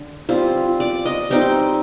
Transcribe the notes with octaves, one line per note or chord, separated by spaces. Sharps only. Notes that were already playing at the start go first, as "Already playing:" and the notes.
Already playing: D3
G3 C4 F4
D5
D#5
G3 C4 D#4 G5